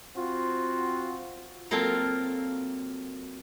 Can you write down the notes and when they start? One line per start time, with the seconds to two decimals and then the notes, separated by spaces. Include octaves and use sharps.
0.15 C4 F4 F#4
1.71 F#3 A#3 C4 F4 A4 A#4